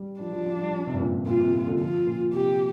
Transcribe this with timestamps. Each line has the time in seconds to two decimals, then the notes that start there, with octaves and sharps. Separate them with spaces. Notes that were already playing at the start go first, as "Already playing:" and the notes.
Already playing: G3
0.20 F3 D4
0.33 F3
0.46 F3
0.60 G3
0.73 F3
0.87 C3
0.93 G2
1.00 A#2
1.14 A#2
1.26 A#2 F4
1.40 C3
1.53 A#2
1.67 D3
1.80 F3 F4
2.07 A#2
2.33 C3 G4